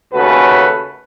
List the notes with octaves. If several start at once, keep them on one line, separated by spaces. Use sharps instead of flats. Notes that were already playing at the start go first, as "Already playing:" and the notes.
D#2 C#3 A3 F#4 A4 B4